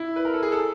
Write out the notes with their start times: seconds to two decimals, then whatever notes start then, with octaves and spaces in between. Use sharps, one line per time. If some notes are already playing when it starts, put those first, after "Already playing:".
Already playing: E4
0.16 B4
0.25 A#4
0.34 A4
0.42 G#4
0.52 A4